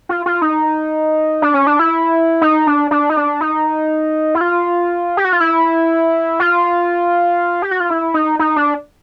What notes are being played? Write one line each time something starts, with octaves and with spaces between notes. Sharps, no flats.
F4
F4
D#4
D4
C#4
D4
E4
D#4
D4
D4
D#4
D4
D#4
E4
F4
G4
F#4
F4
E4
F4
G4
F#4
F4
E4
D#4
D#4
D4